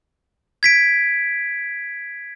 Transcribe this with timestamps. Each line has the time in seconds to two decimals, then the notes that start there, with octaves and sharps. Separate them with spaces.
0.63 G#6 B6 D7